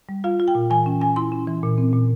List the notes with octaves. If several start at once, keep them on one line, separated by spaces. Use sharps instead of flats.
G3
F4 F5
F4
G5
A#2
E3 G#5
C#4
C#4 G#5
E4 C6
C#4
E3
A#2
C4
A#2